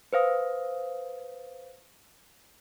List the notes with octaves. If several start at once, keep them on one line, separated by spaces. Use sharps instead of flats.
B4 C5 F5 D#6